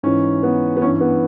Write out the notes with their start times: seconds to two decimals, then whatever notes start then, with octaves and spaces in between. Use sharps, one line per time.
0.03 G#2 E3 C#4
0.43 B3
0.77 B3
0.82 G2 C#4
0.85 E3
1.01 B3